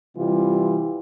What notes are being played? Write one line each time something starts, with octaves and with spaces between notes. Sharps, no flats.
C3 E3 G3 F4